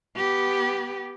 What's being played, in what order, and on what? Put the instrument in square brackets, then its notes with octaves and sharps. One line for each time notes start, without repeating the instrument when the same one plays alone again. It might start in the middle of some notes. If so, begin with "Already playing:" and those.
[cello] B3 G4